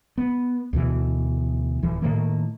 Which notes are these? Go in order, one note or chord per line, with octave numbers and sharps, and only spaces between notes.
B3
D2 B2 E3
D1 E3
A2 D#3 A3 A#3